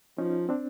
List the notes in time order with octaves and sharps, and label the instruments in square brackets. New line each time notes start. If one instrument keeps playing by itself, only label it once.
[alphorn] F3 [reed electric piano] C#4 D#4
[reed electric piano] C4 D4